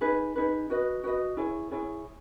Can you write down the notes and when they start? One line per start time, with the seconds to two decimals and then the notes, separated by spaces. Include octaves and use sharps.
0.01 D#4 G#4 B4
0.36 D#4 G#4 B4
0.70 F#4 B4 D#5
1.04 F#4 B4 D#5
1.37 E4 G#4 C#5
1.71 E4 G#4 C#5